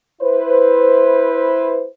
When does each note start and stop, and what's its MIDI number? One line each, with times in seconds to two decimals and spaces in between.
0.22 1.87 64
0.22 1.87 71
0.22 1.87 72